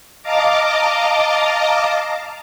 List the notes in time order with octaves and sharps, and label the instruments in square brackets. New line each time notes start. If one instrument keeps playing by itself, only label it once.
[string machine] D#5 F5 A5 A#5 D6